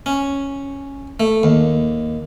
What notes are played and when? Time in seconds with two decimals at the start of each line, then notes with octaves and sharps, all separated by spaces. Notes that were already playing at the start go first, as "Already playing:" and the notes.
0.06 C#4
1.20 A3
1.43 D#2